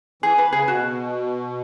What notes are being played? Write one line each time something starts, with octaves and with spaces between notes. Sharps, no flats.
E3 G#4
B4
C#3 G#4
B2 F#4